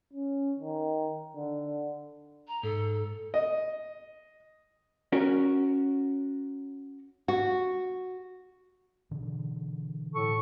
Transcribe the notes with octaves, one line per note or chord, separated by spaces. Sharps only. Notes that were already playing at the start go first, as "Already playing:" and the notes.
C#4
D#3
D3
A#5
G#2 A4
D#5
C#4 F#4 A#4
F#4
B2 D3 E3
A2 A4 C#6